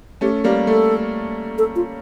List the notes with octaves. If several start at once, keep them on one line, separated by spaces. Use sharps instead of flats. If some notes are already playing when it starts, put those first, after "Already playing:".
A3 C#4 G4
G3 A#3 G4
A3 A4
A4
F4